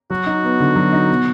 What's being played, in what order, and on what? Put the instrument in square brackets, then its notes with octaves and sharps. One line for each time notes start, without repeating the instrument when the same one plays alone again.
[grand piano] F#3 [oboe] F#4
[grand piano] D#4
B3
D3
F#3
D#4
B2